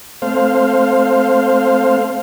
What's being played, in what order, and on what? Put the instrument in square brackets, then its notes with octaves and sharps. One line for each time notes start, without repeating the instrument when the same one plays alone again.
[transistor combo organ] A3 C4 C5 F5